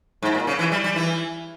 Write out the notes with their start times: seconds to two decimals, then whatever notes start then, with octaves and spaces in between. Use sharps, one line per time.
0.23 G#2
0.35 A#2
0.47 C#3
0.59 E3
0.72 G3
0.84 G3
0.96 E3